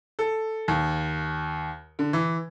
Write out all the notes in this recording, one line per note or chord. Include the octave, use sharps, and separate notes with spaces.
A4
D#2
D3
E3